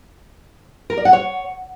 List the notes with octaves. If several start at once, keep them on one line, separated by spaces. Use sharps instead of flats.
A#4
D5
F#5
C#5